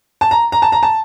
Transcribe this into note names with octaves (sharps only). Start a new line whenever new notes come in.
A5
A#5
A#5
A5
A#5
A5